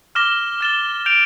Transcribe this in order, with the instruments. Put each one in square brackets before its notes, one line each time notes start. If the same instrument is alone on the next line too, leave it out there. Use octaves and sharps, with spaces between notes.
[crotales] D6 F6 A#6 E7 G7
F6 A6 E7 G7
G6 D7 F7